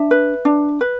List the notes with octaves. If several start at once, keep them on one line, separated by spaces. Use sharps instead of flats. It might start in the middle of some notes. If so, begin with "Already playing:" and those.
Already playing: D4 E5
B4
D4
B4